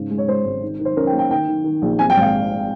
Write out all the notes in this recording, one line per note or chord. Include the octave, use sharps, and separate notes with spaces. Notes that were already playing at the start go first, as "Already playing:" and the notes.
Already playing: G#2 C#3
G#3
C#5
G#3 C5
G#1
D#3
D#3
C5
C#4 A#4
G5
A#3
G5
D#3 G5
D#3
D#3
A#1
C4 G#5
G5
G#1 F5